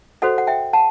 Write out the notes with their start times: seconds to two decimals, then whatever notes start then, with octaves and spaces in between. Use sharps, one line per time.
0.22 F#4 A4 C5 D#5 F#5
0.38 F#5
0.47 E5 G5
0.73 F#5 A5